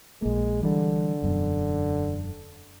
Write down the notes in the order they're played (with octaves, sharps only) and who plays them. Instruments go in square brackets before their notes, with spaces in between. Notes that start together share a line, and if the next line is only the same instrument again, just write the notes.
[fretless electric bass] A#1 A#3 [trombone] G#3
[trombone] D3 [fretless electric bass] E3 G3
[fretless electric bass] E1 F#2 B2